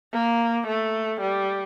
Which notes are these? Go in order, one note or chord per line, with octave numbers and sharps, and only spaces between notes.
A#3
A3
G3